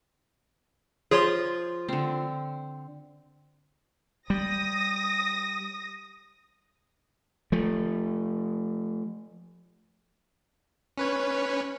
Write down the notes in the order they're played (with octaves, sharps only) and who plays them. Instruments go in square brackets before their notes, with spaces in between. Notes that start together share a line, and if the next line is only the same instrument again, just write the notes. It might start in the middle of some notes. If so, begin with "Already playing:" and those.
[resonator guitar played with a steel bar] F3 [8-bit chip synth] G#4 C#5 C6
[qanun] D3 C4
[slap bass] G3 [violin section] D#6 A#6
[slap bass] F3 A3
[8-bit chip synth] C#4 B4 C#5